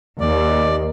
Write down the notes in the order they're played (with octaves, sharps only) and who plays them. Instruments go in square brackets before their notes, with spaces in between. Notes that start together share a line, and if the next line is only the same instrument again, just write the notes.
[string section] D#2 [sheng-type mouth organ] D5